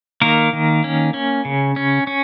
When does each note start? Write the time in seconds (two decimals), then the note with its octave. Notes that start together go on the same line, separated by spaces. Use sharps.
0.21 D#3 A#3 A#4
0.53 D#3
0.84 C#4
1.14 C#4
1.45 C#3
1.76 C#4
2.07 C#4